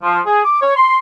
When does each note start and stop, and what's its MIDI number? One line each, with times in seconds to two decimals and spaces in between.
0.03 0.20 53
0.26 0.44 68
0.45 0.58 86
0.62 0.76 73
0.77 0.98 84